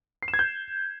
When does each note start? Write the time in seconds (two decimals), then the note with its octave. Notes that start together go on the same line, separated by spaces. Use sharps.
0.23 C7
0.28 E7
0.34 G#6
0.39 G6